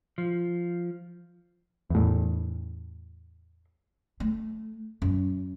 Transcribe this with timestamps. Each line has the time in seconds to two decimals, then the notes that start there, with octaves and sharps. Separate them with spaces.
0.18 F3
1.90 E2 A2
4.20 A3
5.02 F#2